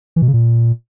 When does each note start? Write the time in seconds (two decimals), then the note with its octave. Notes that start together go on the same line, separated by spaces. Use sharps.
0.16 E3
0.22 B2
0.28 C#3
0.34 A#2